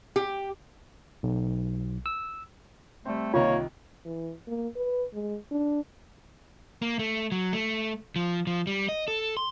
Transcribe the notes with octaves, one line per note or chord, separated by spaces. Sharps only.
G4
B1
E6
G3 A3 C4
C2 D#3 A#3 F4 C#5
E3
A#3
B4
G#3
D4
A#3
A3
F#3
A3
F3
F3
G3
D#5
A4
C6